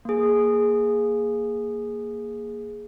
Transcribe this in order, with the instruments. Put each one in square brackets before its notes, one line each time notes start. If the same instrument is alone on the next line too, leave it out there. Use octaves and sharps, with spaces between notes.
[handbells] A#3 G#4